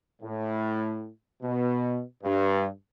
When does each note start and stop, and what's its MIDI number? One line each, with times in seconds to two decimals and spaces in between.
0.22 1.08 45
1.43 2.00 47
2.23 2.67 43